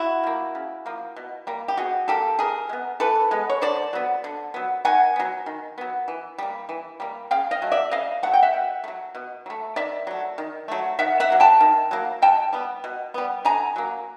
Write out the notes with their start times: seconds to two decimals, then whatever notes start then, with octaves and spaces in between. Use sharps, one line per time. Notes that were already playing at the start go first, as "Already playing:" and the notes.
Already playing: E4 F#4
0.23 F3 A#3
0.55 C#3
0.86 F3 A#3
1.16 B2
1.47 G3 A#3
1.68 G4
1.77 B2 F#4 G#4
2.08 G3 A#3 G4 A4
2.39 E3 G#4 A#4
2.69 G#3
2.73 B3
3.00 E3 A4 B4
3.31 G#3 B3
3.50 C#5
3.61 D3 C5 D5
3.93 F#3 B3
4.24 D3
4.54 F#3 B3
4.85 D#3 F#5 G#5
5.16 F#3 B3
5.46 D#3
5.78 F#3 B3
6.08 E3
6.38 G3 A#3
6.69 E3
7.00 G3 A#3
7.31 C#3 F5 G5
7.51 D#5 F5
7.62 F#3 A3
7.72 D5 E5
7.91 C#3 D#5 F5
8.23 F#3 A3 F#5
8.33 G5
8.42 E5 F#5
8.53 B2
8.84 A3
8.88 F#3
9.15 B2
9.46 F#3
9.50 A3
9.76 D#3 D5 E5
10.07 F#3 A3
10.38 D#3
10.68 F#3 A3
10.99 D#3 E5 F#5
11.20 E5 F#5
11.30 F#3 A#3
11.40 G5 A5
11.60 D#3
11.91 F#3 A#3
12.22 B2 G5 A5
12.53 G3 B3
12.84 B2
13.14 G3 B3
13.45 D3 G#5 A#5
13.76 F#3 A#3